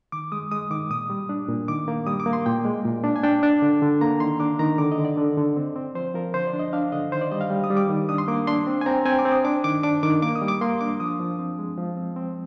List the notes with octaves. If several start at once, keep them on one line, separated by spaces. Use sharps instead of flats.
D#3 D6
G#3 D#6
G#3 D#6
D#3 D6
A#2 D#6
G3
D4
A#2
D#3 D6
A#3
G3 D#6
D6
A#3
C6
A#2 G5
G#3
A#2
D4
G#5
D4 G5
D4
D3
D3
A#3 A#5
D#3 C6
D4 D6
D#3 A#5
D3 D6
D#5
D3
D5
D3
D3
C4
C4
F3 C5
F3 A#4
D3 C5
D5
D4
D#5
D4 F5
D3 D#5
D#3 C5
D5
G3 D#5
F5
G3
D#6
G3
D6
D#3
D4 D#6
C6
A#3 D6
D4 C6
C4
G#5
C4 A#5
C4 G#5
D6
C4
D#6
D4 D6
D#3 D6
D4 D6
D#3 D6
A#3 D6
D#6
G3
D6
A#3 C6
D4 D6
F3 D#6
F3
C4
G#3
F3
C4
C4